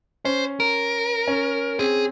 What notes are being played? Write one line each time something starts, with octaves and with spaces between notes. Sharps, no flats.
C#4 C5
A#4
C#4
C4 G#4